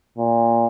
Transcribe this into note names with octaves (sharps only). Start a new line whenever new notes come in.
A#2